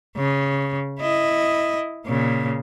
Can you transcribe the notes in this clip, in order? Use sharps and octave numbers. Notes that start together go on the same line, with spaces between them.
C#3
E4 D#5
A#2 C#3